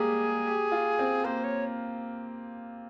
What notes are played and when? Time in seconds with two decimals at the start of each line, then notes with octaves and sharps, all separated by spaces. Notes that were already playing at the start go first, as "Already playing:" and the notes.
Already playing: G3 G#3 A#3 G4 G#4
0.46 G4
0.72 F4
0.99 C4
1.25 A#3 C5
1.44 C#5